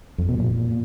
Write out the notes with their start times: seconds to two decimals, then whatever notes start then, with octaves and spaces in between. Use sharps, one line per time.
0.18 F2
0.29 B2
0.39 A#2